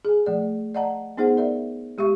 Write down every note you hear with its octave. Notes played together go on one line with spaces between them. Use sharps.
G#4 G#5
F3 A3 D5
D5 D#5 F#5 A5 A#5
B3 D#4 G#4 C5 F#5
A#4 D5 E5
G#3 G4 E5 C#6